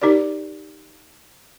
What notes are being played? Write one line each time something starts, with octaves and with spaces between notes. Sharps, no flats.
D#4 G4 A#4 D5